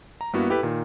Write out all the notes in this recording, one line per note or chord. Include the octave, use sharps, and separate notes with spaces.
A#5
G2 A#3 B3 E4 F#4
E4 G4 A4 B4
A#2 D#3